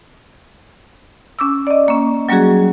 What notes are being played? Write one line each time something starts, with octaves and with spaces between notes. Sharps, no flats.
C#4 D6 E6
D5 D#5
A#3 C#4
F#3 G3 A#3 C#4 F#4 G#4